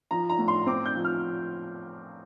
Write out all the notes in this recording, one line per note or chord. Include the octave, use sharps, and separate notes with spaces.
F3 A#5
A#5
A2
C6
C4 D6
G6
F3
F6